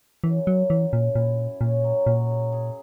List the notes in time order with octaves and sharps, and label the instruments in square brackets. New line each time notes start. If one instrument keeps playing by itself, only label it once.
[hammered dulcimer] F#2 [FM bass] E3
[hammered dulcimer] F#2 [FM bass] F#3
[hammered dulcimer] F#2 [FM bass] E3
[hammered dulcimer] F#2 [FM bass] A#2
[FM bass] A#2 [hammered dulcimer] E4
[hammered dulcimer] E4
[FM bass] A#2 [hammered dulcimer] C#4
[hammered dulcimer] F#3
[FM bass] A#2 [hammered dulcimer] F#3
[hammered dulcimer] G#4
G#4